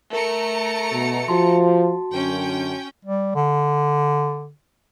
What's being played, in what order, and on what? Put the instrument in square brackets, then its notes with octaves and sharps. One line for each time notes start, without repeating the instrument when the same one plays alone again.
[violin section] A3 A#5 C#7 [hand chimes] A#4
[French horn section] B2
[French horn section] F3 [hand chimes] F#4 A5 C6
[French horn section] F#2 D3 [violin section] C#4 G5
[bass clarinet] G3
D3